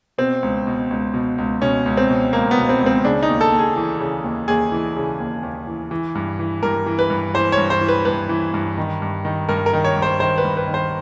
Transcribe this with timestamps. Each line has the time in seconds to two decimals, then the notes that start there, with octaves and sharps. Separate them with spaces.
0.18 B2 C4
0.43 C#2
0.67 B2
0.90 C#2
1.14 B2
1.38 C#2
1.62 B2 C#4
1.86 C#2
1.97 C4
2.10 B2
2.33 C#2 A#3
2.51 B3
2.58 B2
2.69 C4
2.81 C#2
2.86 C4
3.04 C#3 D4
3.23 D#4
3.29 D#2
3.41 A4
3.52 D#2
3.59 G#4
3.76 E3
4.00 C#3
4.24 D#2
4.48 D#2 G#4
4.72 E3
4.96 C#3
5.20 D#2
5.43 D#2
5.67 E3
5.91 E3
6.15 G2
6.39 E3
6.63 G2 A#4
6.86 E3
6.99 B4
7.10 G2
7.34 E3 C5
7.52 C#5
7.58 G2
7.70 C5
7.81 E3
7.88 B4
8.05 G2 B4
8.29 E3
8.54 G2
8.78 D#3
9.02 G2
9.25 D#3
9.49 G2 A#4
9.66 A#4
9.73 D#3
9.84 C#5
9.96 G2
10.02 C5
10.20 D#3 C5
10.38 B4
10.45 G2
10.57 B4
10.68 D#3
10.74 C5